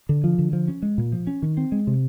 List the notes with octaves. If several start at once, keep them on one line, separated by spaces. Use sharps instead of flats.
D3
F3
D3
F3
C#4
G#3
A#2
F3
C#4
D#3
C4
G#3
C3